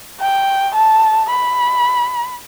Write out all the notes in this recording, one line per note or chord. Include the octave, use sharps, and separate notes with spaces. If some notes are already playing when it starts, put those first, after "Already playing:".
G5
A5
B5